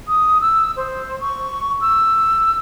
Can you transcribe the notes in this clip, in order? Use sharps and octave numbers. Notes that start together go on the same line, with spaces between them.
D#6
E6
C5
C#6
E6